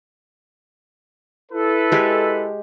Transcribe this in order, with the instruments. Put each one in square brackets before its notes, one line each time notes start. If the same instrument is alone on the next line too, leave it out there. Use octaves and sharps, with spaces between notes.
[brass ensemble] E4 A4 B4
[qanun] G#3 G4 G#5